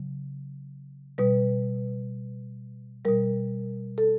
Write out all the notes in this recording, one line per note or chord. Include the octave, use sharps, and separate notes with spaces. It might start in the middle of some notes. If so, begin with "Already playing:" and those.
Already playing: C#3 F#3
B2 G3 B4
B2 G3 A#4
A4